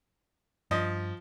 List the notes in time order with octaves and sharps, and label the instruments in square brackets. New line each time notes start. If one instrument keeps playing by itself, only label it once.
[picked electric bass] G2 [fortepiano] F3 D#5